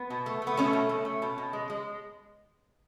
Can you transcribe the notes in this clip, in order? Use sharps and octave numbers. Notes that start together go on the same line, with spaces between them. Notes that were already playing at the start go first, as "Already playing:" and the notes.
Already playing: B3
B2
A3
A3
B3
B2 A3 C#4
B2
A3
A3
B2
B2
G#3
G#3